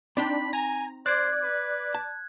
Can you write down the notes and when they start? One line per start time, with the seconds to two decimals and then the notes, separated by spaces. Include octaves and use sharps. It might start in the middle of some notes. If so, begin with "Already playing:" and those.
0.17 C4 D4 D#4 G5 B5
0.53 G#5 A#5
1.06 C5 D5 F#6 G#6
1.42 B4
1.95 A5